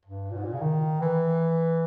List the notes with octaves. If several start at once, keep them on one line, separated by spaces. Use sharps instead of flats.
G2
A#2
G#2
A#2
C#3
D#3
E3